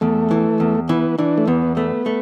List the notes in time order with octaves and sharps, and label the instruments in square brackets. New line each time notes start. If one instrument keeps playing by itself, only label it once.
[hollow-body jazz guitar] E2 [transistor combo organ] A3
[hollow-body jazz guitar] E3
E2
[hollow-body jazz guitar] E3 [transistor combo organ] B3
[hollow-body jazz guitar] E3 [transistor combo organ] D4
[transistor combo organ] A3
[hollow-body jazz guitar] E2 [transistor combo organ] B3
[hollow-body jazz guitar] A3 [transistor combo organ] B3
[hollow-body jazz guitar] A3